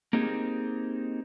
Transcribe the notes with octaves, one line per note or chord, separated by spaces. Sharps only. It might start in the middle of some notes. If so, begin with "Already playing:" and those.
A#3 C4 D#4 G4 G#4